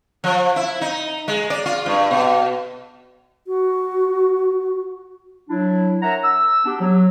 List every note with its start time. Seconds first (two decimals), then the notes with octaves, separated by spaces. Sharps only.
0.24 F3
0.56 E4
0.81 D#4
1.28 G#3
1.50 D5
1.66 F4
1.86 G2
2.11 B2
3.46 F#4
5.49 F#3 D4 E4
6.02 A#4 C#5 E5 F#5 A#5
6.24 E6
6.65 B3 D4 G4
6.81 F#3